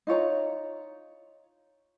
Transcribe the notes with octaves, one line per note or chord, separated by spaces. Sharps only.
D#4 F4 C#5 A#5